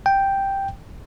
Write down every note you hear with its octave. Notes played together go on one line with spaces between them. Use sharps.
G5